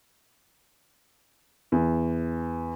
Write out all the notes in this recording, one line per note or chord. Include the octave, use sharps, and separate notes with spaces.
E2